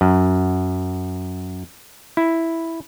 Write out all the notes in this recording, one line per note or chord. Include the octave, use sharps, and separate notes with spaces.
F#2
E4